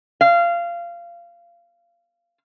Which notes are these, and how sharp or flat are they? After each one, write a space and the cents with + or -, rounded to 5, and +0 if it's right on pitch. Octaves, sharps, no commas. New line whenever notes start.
F5 -20